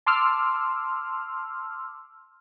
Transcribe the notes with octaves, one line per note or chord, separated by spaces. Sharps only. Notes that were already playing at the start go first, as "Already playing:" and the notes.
A5 C6 D6 E6 F6